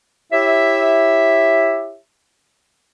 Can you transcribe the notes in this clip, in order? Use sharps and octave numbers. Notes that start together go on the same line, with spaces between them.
E4 G4 C#5 E5